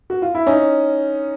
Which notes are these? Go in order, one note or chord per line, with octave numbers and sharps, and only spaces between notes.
F#4
F4
E4
C#4 D#4